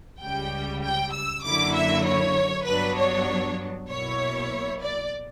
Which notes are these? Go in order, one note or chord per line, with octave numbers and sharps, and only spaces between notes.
C#2 C#3 G3 G5
G5
E6
F#2 D3 F#3 A#3 E4 D6
E5
C#5
G2 F#3 B3 D4 B4
C#5
B1 B2 A#3 E4 C#5
D5